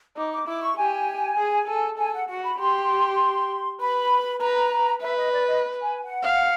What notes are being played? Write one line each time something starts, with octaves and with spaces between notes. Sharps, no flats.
D#4 D6
D6
E4 D6
C#6
G4 G#5
G#4
A4
A4 G#5
F#5
F#4 F#5
B5
G4 C6
B4 B5
B4 A#5
B4 E5
D#5
D5
D#5
G#5
F#5
F5